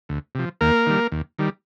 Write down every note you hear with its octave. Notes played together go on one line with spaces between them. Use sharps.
D2
C3 F3
D#2 A#3 A#4
D#3 G3
D#2
D#3 G3